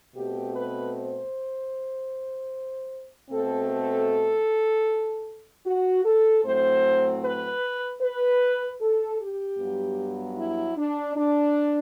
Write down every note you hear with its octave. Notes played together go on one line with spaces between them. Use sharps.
B2 A3 C4 G4
B4
C5
B2 A3 C4 A4
A4
F#4
A4
A2 F#3 A3 C4 C5
B4
B4
A4
G4
G2 F#3 B3
E4
D4
D4